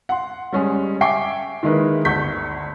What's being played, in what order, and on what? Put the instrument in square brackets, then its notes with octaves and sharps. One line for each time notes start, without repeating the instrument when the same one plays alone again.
[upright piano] F#5 C6
G3 G#3 C#4 G#4
E5 G5 G#5 C#6 D6 C7
D#3 G#3 A#3 D#4 E4 B4
G1 D2 C#6 G6 B6